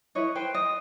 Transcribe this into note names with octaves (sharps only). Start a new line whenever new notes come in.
E4 B4 C#5 D#5
B4 C5 G5
D#5